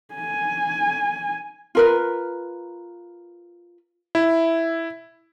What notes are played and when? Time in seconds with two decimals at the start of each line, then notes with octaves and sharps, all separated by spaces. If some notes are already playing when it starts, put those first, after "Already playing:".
0.15 G#5
1.75 F4 A#4 B4
4.15 E4